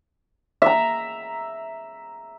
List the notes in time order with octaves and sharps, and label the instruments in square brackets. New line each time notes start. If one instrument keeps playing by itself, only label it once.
[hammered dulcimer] E5 A#5